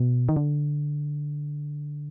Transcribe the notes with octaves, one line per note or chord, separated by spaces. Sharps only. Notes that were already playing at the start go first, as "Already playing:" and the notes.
Already playing: B2
D#3
D3